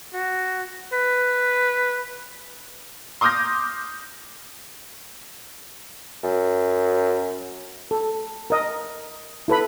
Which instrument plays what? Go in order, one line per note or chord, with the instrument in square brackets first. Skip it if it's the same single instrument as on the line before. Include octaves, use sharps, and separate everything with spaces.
[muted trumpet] F#4
B4
[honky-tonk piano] C6 D6 D#6 F6 G6 A#6
[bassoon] F#2
[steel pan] A4
A#4 D#5
E4 A4 B4 B5